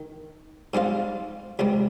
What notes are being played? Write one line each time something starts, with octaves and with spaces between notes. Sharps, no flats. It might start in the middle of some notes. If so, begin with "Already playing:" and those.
Already playing: D#3
G#2 G3 C4 F4
C#2 C3 G3